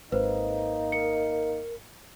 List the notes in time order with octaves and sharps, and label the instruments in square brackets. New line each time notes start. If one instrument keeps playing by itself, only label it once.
[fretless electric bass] G#1 [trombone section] A#3 D#4 [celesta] B4 C5
[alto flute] A#4 [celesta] C#7